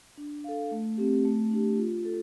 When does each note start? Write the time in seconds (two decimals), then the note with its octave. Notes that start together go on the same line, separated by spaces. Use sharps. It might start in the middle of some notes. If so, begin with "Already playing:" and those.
0.18 D4
0.44 A4 F5
0.71 A3
0.98 C4 G4
1.25 A3
1.51 D4 G4
1.78 F4
2.05 A4